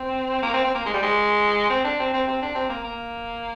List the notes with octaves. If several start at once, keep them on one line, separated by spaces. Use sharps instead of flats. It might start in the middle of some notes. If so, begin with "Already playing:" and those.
Already playing: C4
A#3
C4
C4
A#3
G#3
G3
G#3
C4
D4
C4
C4
C4
D4
C4
A#3
A#3